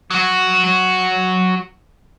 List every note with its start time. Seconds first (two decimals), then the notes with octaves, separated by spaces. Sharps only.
0.11 F#3 F#4